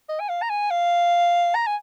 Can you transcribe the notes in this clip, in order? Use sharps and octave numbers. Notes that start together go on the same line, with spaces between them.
D#5
G#5
F5
A#5
G#5
F5
A#5
G#5